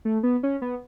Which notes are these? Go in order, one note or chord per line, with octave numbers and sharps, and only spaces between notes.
A3
B3
C#4
B3